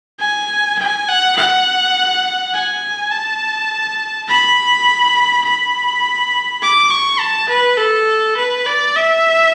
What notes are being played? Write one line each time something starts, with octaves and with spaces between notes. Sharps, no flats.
G#5
G#5
F#5
F#5
G#5
A5
B5
B5
D6
C#6
A5
B4
A4
B4
D5
E5